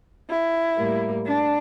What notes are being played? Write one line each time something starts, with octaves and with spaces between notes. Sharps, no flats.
E4
A2 G3 A#3
D4